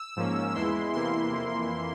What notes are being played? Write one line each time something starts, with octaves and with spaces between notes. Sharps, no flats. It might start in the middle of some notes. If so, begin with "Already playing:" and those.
Already playing: E6
G#2 F3 A#3 C#4
E2 E3 G#3 E4 C6
E2 C3 E3 A#3 E4 C6
F2 E3 A#3 E4